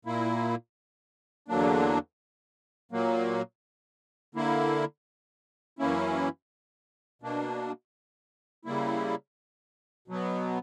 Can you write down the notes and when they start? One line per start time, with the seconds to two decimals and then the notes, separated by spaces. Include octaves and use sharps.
0.05 A#2 A#3 E4
1.48 E2 D3 F#3 A#3 D4
2.92 A#2 F#3 A#3
4.35 D3 A#3 E4
5.79 F#2 E3 A#3 C#4 E4
7.22 B2 A#3 D4
8.65 C#3 G3 A#3 E4
10.08 B2 F#3 B3